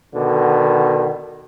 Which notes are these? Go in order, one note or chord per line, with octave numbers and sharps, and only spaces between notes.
B2 D3 D#3